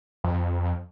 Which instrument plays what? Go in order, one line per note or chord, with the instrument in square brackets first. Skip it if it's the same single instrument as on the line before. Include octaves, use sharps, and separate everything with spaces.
[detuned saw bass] F2